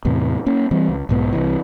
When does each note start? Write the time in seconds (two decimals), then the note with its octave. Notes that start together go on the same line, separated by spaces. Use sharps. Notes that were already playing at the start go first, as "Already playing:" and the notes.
0.05 E2 A2 C3
0.46 A#3 C#4
0.71 E3 G3 C4
0.89 C#2
1.09 B1 G#2 B3
1.33 C2 C3 E3